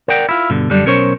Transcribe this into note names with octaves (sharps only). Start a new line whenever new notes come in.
A#4 D5 F#5 G5
E4 F4
G2 B2 D3
F#2 D3 G3 D4
B1 C#4 A#4 C5 C#5